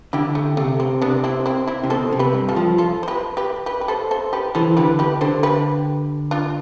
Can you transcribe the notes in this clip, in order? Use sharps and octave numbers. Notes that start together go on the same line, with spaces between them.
D3 E4 G4
A3
C3 A3
C4
C3 B3 D4
C4 E4
C4 E4
C4 E4
C3
B2 A4 C5
C3
G4 B4
G2
F4 A4
F3
F4 A4
C5
G4 B4
G4 B4
G4 B4
B4
A4 C5
A4 C5
G4 B4
E3 A4 C5
D3 G4 B4
G4 B4
D3 A4 C5
G4 B4
D4 F4